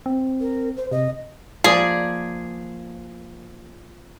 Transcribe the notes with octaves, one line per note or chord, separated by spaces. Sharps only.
C4
A#4
C5
C3 D#5
F3 A#3 G#4 D5